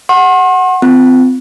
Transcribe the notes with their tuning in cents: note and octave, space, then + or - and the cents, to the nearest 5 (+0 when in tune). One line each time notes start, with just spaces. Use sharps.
F#5 +0 C6 +45
C4 -35 F4 +0